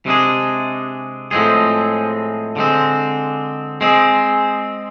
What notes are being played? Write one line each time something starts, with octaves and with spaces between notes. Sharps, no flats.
C3 G#3 D4 G#4
A2 F3 G#3 C4 G#4
D3 G#3 C4
G#3 C4 G#4